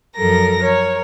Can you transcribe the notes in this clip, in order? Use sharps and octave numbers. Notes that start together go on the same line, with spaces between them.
F#2 F3 A4 A#4 A#6
A#4 C#5